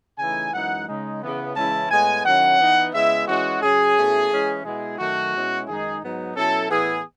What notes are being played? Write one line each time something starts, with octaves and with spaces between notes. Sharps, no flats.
C#3 E3 A3 D#4 G#5
F#2 E3 G#3 D#4 F#5
C#3 G#3 D#4
C#3 E3 B3
C#3 E3 G#3 C#4 E4 A5
A2 G#3 B3 G#5
D#3 F#3 C#4 E4 F#5
E3 B3 D#4
C#3 G#3 B3 E4 E5
E3 G#3 C#4 E4 F#4
C#3 F#3 C#4 G#4
B2 A3 C#4 E4
E3 G#3 C#4 E4
B2 G#3 B3 E4 G#4
F#2 D#3 F#3 A3 F#4
B2 G#3 C#4 E4
F#2 D#3 G#3 D#4 G#4
G#2 F#3 B3 D#4
B2 F#3 C#4 E4 A4
A2 E3 B3 G#4